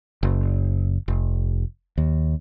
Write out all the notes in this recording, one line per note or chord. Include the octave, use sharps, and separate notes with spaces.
F#1
F1
D#2